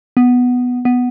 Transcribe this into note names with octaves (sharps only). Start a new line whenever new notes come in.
B3
B3